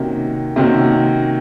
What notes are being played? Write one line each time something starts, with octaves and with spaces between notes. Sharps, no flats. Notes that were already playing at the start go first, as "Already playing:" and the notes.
Already playing: C3 D#3 A#3 C#4 F#4
C3 D#3 A#3 C#4 F#4